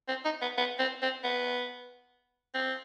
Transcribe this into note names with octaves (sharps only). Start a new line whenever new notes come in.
C4
D#4
B3
B3
C4
C4
B3
C4